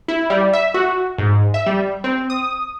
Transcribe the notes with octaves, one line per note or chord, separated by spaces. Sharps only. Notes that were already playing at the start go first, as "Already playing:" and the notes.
E4
G3
E5
F#4
G#2
E5
G3
C4
D#6